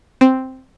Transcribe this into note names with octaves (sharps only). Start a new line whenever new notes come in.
C4